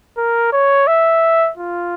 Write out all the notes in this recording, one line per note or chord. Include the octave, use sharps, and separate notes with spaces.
A#4
C#5
E5
F4